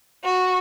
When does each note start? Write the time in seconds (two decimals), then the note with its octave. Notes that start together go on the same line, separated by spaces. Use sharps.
0.24 F#4